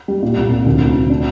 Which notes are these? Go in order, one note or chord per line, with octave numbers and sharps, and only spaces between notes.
G3
A#2
C2
C2
D2
D2
D2
D4